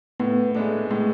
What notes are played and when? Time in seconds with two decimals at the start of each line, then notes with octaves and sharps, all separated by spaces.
0.20 A2 B3
0.55 G#3 A3 B3 D4
0.91 A2 G#3